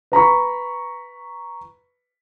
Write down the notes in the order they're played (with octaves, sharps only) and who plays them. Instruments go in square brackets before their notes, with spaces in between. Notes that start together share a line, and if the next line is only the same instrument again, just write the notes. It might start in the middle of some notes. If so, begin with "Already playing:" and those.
[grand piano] B4 A#5 B5 C#6